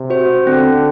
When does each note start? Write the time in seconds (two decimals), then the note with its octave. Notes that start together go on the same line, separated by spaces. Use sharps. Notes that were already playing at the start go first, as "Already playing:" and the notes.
Already playing: C3
0.10 F#4 C5
0.47 D3 C4